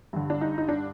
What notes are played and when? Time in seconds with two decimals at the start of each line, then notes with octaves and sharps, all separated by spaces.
0.13 G2 D3
0.30 D4
0.41 D#4
0.58 D#4
0.68 D4